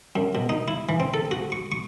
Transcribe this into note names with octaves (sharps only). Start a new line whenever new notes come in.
F#2
B2
D#4
E4
E3
C4
A4
F#4
C#6
C#6